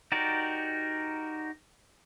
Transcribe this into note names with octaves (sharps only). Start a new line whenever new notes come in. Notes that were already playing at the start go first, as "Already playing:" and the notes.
D#4 F#4 G4 A#4 D5